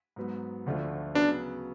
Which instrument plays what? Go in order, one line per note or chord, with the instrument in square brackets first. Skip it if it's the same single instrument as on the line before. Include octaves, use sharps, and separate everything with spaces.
[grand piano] G#2 F#3 B3
D2 D3 F3 A3 F4
[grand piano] C#3 F#3 B3 [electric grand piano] D4